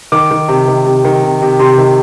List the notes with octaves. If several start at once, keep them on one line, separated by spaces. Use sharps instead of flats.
D#3 D6
D#3
C3
D#3
C3
D#3
C3
C3
C3 C6
D#3